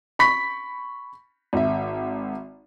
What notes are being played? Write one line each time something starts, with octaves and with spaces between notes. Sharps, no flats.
B5 C#6 B6
G#1 E5